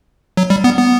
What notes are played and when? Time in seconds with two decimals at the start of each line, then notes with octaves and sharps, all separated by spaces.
0.37 F#3
0.50 G3
0.64 B3
0.78 B3